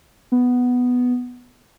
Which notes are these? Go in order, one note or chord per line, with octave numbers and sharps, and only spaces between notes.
B3